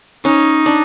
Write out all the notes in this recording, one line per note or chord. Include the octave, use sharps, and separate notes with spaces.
C#4 D#4
D4